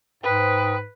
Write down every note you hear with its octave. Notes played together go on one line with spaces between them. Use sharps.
G#2 B4 C5 G5 D#6